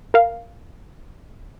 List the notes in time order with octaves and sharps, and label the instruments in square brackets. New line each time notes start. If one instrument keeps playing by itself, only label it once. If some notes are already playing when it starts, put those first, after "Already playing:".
[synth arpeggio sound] A#4 F5